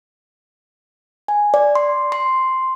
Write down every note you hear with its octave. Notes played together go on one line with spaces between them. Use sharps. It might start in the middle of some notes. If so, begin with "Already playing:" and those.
G#5
D5
C6
C6